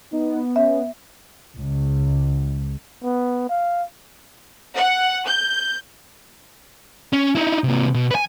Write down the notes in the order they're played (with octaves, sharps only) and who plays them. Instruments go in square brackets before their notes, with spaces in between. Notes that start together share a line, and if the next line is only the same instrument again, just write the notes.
[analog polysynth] B3 [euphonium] D#4
[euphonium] C#4 [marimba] E5
[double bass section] C#2
[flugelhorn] B3
F5
[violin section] F#5
G6
[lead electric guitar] C#4
D#4 E4
C3 A#3
B2
B4 G#5